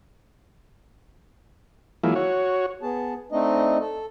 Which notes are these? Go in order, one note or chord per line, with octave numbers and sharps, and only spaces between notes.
E3 F#3 G#3 A#3 E4 F4
F#4 C#5
B3 G#4 A5
A3 C4 D4 D#4 D#5
A4